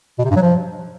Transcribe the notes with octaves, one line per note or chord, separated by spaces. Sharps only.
B2
C3
G2
F#3
F3